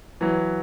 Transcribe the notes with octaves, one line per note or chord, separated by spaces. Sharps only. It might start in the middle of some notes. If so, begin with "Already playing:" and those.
E3 F#3